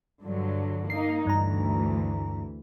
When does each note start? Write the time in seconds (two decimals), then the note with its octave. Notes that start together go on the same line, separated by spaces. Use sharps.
0.22 G2 D3 F#3
0.90 A#3 D#4 C7
1.27 D2 G2 E3 A#5